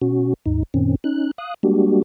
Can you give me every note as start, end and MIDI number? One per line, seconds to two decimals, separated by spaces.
0.01 0.34 47
0.01 0.34 61
0.01 0.34 66
0.46 0.63 39
0.46 0.63 44
0.46 0.63 63
0.74 0.95 42
0.74 0.95 46
0.74 0.95 51
0.74 0.95 60
0.74 0.95 61
1.04 1.31 61
1.04 1.31 63
1.04 1.31 90
1.38 1.54 77
1.38 1.54 87
1.38 1.54 90
1.63 2.02 55
1.63 2.02 56
1.63 2.02 58
1.63 2.02 62
1.63 2.02 66
1.63 2.02 67